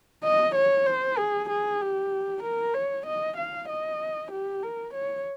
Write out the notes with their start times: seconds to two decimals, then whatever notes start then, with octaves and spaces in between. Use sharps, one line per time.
0.24 D#5
0.55 C#5
0.87 C5
1.18 G#4
1.49 G#4
1.81 G4
2.43 A#4
2.74 C#5
3.06 D#5
3.37 F5
3.69 D#5
4.31 G4
4.63 A#4
4.94 C#5